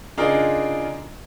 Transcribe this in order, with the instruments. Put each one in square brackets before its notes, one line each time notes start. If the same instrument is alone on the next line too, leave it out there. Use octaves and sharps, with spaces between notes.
[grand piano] C#3 D4 D#4 F4 G#4 A#4